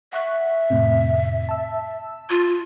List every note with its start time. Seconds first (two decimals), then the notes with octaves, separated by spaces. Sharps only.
0.13 E5 F#5 C#6 F#6
0.70 F2 A2 C3
1.49 A5 E6
2.30 F4